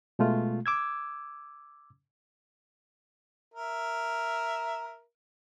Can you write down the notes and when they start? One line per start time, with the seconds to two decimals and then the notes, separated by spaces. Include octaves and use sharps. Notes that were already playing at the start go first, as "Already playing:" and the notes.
0.19 B2 G#3 A3 F4
0.66 D6 E6 G#6
3.54 A#4 E5